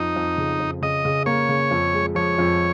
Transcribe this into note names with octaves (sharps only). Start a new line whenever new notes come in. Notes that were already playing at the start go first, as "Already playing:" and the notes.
Already playing: F2 D#4
F2
C#3
F2
C#3 D#5
C#3
A#3 C#5
C#3
F2
G#3
F3 C#5
F2